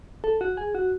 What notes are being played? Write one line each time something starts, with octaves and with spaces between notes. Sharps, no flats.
A4
F#4
G#4
F#4